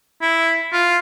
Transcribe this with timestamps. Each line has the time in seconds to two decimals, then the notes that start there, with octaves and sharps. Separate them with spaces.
0.22 E4
0.73 F4